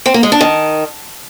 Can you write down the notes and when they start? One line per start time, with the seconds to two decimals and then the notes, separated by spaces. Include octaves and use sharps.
0.06 C4
0.14 A#3
0.23 G#3
0.32 D4
0.41 D#3